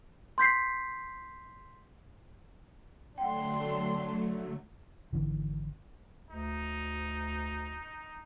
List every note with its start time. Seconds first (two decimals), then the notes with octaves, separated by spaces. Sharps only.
0.38 C6 G6 B6 C7
3.18 D3 F#3 A3 D4 F#5 G5 C6
5.12 G#1 D3 E3
6.30 D2 D#4